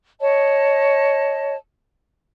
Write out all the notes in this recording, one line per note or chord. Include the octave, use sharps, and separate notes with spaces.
C#5 D#5 A5